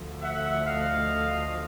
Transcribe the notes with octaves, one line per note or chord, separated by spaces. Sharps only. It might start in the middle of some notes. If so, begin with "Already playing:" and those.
Already playing: D2 D3 F3 A3
E5 F#5
D#5 F5